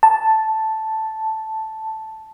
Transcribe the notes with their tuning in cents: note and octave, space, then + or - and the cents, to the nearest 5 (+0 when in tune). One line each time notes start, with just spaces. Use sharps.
A5 +0